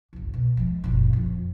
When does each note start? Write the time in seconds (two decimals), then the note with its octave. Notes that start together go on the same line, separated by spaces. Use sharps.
0.13 F#1 C2
0.33 B2
0.57 F3 G#3
0.84 F#1 A#2
1.13 F2 F4